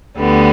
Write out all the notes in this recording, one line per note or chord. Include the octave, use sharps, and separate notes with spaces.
D2 D3 G3 B3